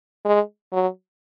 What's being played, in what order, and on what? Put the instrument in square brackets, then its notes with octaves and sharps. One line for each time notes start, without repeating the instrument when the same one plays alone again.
[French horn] G#3
F#3